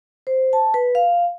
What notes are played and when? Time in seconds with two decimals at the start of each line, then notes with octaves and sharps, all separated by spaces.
0.27 C5
0.53 A5
0.74 B4
0.95 F5